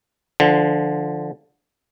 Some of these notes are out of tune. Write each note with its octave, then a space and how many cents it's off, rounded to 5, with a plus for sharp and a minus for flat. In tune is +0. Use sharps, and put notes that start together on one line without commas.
D3 +0 F3 -20